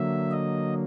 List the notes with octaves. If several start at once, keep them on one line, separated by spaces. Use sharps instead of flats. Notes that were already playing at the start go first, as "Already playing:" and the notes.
Already playing: D3 F#3 A#3 E5
D#5